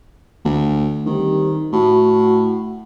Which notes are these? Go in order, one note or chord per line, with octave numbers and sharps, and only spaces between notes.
D2
D#3 G3 C4 G4
A2 F#4